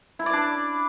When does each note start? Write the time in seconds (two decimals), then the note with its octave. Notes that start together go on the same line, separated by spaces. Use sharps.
0.19 E4
0.26 D5
0.33 D4